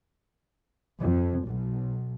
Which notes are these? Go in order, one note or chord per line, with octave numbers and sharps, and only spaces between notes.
F2
B1